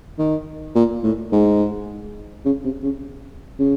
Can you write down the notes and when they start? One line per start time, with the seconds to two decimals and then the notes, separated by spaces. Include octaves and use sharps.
0.19 D#3
0.75 A#2
1.03 A2
1.32 G#2
2.45 C#3
2.64 C3
2.83 C#3
3.59 C#3